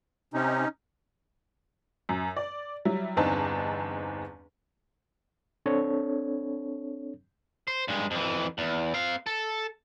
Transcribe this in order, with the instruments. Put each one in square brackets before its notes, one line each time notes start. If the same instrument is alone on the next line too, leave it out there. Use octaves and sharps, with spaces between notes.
[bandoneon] C3 [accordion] C#4 D#4
[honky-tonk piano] F#2
D5
F#3 G3 E4
G1 E2 C4 D4 D#4 A5
[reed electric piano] C4 D4 A4 C#5
[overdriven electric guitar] C5
G2 G#3
F2 E3
E2
C4 F5
A4